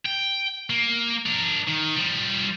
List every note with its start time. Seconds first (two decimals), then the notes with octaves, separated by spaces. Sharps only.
0.06 G5
0.70 A#3
1.26 D4 A#4
1.67 D#3
1.96 F3 G3